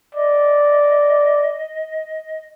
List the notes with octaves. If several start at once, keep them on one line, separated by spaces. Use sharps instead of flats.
D5 D#5